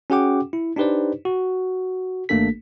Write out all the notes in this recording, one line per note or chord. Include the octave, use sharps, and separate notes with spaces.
C#4 F#4 G#4 F#5 G5 D6
E4
D4 D#4 G4 B4 C5 D5
F#4
G#1 A3 A#3 D4 A4 B6